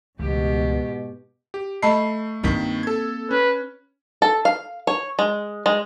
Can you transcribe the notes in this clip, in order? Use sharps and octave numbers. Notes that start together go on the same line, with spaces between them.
C#2 G#2 B2 E3 A3 G4
G4
A3 D#5 A5 B5 C7
G2 D#3 A#3 C4 B6
A4 G#6
C#4 B4
A4
F5
C#5
G#3
G#3